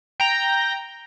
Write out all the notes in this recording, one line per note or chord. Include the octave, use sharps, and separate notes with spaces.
G5 A#5